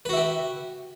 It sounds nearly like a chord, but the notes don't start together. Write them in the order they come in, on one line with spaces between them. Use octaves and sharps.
B4 F#4 E5 G4